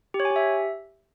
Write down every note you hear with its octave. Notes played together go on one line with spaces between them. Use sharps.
G4
C#5
G#5
G4
E5